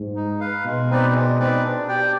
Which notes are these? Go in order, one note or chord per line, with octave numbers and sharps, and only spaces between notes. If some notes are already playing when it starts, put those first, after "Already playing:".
Already playing: G#2
D#4
B4 F5
B2 G#3
C4 D#4 B4 D5
G#3
C4 D#4 B4 D5
D4
G4 D5 G5